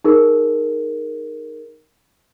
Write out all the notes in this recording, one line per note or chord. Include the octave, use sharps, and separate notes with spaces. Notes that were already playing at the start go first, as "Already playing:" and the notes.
D#4 G#4 A#4